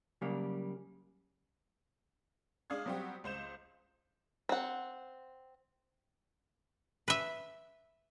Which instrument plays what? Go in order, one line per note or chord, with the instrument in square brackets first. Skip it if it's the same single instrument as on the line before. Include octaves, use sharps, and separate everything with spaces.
[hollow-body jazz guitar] C#3 F#3 G3 A#3
[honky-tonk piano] G#3 D4 F5 D#6 G#6
F#3 G3 C4 F#4 G4
C#2 C5 G6 E7
[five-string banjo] C4 F#5
[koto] B4 E5